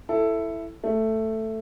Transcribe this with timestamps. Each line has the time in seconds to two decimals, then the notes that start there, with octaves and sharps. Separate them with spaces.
0.09 E4 A4
0.84 A3